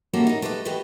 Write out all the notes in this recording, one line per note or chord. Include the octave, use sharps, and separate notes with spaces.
A#3 C#4 E4 F#4 G4 A4
D#4 A#4
A3 G4 B4 C5 D#5
E2 F#4 G4 A4 B4 D#5